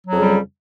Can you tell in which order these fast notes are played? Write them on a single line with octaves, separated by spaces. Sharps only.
F#3 F2 C#3 G3